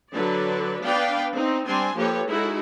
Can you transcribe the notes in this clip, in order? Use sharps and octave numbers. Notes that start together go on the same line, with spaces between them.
D3 F#3 A4 B4 D5
B3 D4 B4 D5 F5 G5
C4 D#4
G3 C4 D4 G#5 C6
F3 A#3 G4 A4 B4 C#5
G#3 D#4 E4 F#4 G#4 A4